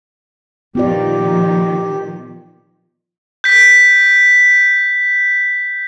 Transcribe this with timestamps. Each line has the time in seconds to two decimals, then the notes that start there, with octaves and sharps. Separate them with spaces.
0.75 A#2 D#3 F3 B3 F4 G4 D5
3.44 G6 B6